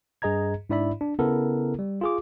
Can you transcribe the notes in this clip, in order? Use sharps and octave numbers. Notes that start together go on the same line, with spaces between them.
G2 G#4 D#5 A#5 G#6
G#2 D4 E4 D5 E5 B5
D4
C#3 B3 E4 A4 A#4
G3
F4 G#4 D6